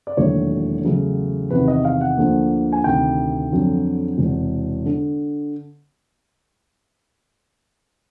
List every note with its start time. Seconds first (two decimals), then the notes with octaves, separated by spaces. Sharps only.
0.07 D5
0.17 E1 D#2 D3 F#3 A3 C#5
0.85 E2 C#3 F#3 A3
1.50 E2 C3 D#3 B4
1.68 D#5
1.85 F5
2.01 F#5
2.17 D2 D3 F3 A#3
2.73 G#5
2.84 D2 C3 D#3 G5
3.52 F2 D3 F#3
4.18 E1 E2 C3
4.86 D3